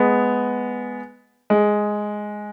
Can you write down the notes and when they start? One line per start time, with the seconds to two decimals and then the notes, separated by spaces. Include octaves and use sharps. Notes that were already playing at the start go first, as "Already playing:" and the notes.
Already playing: G#3 B3
1.50 G#3